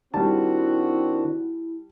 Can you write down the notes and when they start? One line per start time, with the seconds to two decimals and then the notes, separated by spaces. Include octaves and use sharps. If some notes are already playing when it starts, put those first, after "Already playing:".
0.14 D#3 G3 C4 D4 E4 F#4 A5